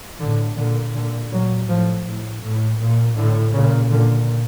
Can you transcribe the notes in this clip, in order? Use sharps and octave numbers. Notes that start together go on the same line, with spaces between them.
A2 D3
A#2 D3
A#2 D3
A#2 F#3
A2 F3
A2
A2
A#2
A2 D3
A#2 C#3
A#2 D3